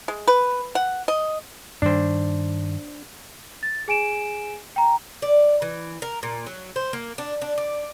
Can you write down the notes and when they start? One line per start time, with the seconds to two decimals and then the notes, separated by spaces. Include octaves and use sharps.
0.08 G#3
0.28 B4
0.75 F#5
1.08 D#5
1.82 G2 D#3 G3 D4 C5
3.63 A6
3.88 G#4 G#5 D7 E7
4.76 G5 A#5
5.22 D5
5.62 E3
6.02 A#4
6.23 A#2
6.46 F#3
6.76 C5
6.93 A#3
7.18 D4
7.42 D4
7.58 D5